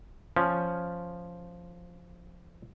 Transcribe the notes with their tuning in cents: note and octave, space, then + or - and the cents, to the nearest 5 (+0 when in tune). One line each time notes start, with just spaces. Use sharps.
F3 +0 C#4 +0